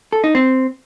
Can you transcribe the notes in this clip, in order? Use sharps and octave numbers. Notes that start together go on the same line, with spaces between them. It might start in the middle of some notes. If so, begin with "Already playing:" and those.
A4
D#4
C4